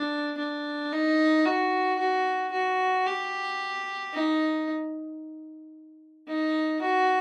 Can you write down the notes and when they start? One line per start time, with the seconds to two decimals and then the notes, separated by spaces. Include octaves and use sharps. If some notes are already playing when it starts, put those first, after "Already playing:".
Already playing: D4
0.38 D4
0.91 D#4
1.45 F#4
1.99 F#4
2.52 F#4
3.06 G4
4.13 D#4
6.28 D#4
6.81 F#4